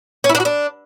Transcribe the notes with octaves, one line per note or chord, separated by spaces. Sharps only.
C#4
E4
D4
F#4
D4